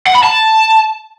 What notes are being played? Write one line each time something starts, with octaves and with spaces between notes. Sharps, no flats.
F#5
B5
A5